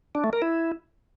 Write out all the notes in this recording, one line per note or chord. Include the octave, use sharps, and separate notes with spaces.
D4
A3
A#4
E4